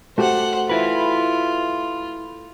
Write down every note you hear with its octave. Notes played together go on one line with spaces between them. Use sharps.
A3 F#4 G4 C5 F#5
E4 F4 B4